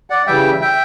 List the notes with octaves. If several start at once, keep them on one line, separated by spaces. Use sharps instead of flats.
D5 F#5
C#3 E3 G3 E5 G5
E5 G5